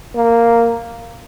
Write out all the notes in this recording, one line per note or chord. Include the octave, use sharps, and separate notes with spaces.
A#3